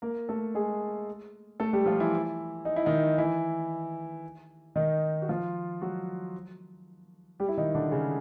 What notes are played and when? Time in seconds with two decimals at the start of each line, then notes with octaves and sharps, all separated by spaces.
0.02 A#3 A#4
0.29 A3 A4
0.55 G#3 G#4
1.60 A3 A4
1.73 G3 G4
1.86 F3 F4
1.99 E3 E4
2.65 D#4
2.76 E4
2.86 D#3 D#4
3.18 E3 E4
4.76 D#3 D#4
5.22 F#4
5.29 F3 F4
5.82 F#3 F#4
7.40 G3 G4
7.48 E4
7.57 D#3 D#4
7.75 D3 D4
7.92 C#3 C#4